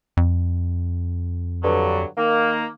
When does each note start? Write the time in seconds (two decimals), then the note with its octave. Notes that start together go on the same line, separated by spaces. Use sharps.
0.17 F2
1.63 G2 D3 F#3
2.17 D#3 A#3